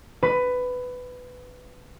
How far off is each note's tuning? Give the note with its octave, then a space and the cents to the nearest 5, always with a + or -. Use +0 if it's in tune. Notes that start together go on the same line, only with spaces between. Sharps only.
B4 +15